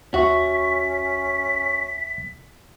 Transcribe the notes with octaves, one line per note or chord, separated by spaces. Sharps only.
D#2 C#4 F#4 E5 C#6 B6